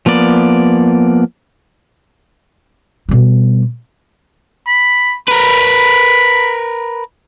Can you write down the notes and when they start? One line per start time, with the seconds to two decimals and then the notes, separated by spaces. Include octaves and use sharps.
0.06 F3 A#3 B3 D5
3.09 B2 G3
4.67 B5
5.28 A#4 B4 B5